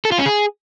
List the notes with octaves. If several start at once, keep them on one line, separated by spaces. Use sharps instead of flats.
A4
F4
C#4
G#4